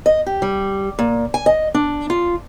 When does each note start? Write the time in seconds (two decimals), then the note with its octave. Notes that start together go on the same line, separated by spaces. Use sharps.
0.06 D#5
0.26 G4
0.42 G3
0.99 A#2
1.34 G#5
1.46 D#5
1.74 D4
2.10 F4